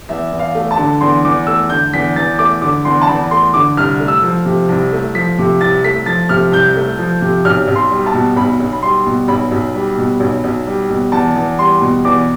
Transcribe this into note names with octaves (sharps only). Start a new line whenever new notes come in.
E2 E5
E2
F5
A3
A5
D3
E2 C6
E2 D6
A3 E6
D3 G6
E2 B6
E2 A6
A3 D6
D3 D6
E2 C6
A5
E2 B5
A3 C6
D3 D6
C2 F6
A3
E6
F3
C3
C2
A3
F3 B6
C3
C2 A6
A3 B6
F3 A6
C3 F6
C2 G6
A3
F3
C3
B1 F6
B1
C6
G3
A5
B2
B1 B5
B1
B5
G3 C6
B2
B1 B5
B1
G3
B2
B1
B1
G3
B2
E2 A5
E2
G3 C6
B2
E2 D6